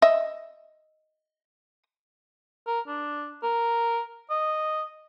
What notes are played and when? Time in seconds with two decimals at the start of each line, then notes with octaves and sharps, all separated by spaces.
0.02 D#5 E5
2.67 A#4
2.88 D4
3.43 A#4
4.30 D#5